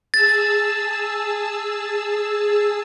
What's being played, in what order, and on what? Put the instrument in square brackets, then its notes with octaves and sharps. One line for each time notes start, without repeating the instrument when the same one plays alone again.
[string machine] G#4 A5 E6 [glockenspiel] A6